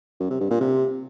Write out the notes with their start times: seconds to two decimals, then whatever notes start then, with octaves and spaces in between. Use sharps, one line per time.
0.20 F#2
0.30 C3
0.40 G2
0.50 A#2
0.60 C3